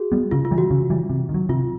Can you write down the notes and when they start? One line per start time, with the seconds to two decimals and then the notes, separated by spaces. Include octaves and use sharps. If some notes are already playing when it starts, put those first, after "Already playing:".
Already playing: F#4 G#4
0.12 G3 B3
0.31 C#3 F4
0.45 F4
0.51 E3 G3
0.58 F#4
0.71 C#3
0.90 E3 G3
1.09 C3
1.29 D#3
1.34 F#3
1.49 C3 F4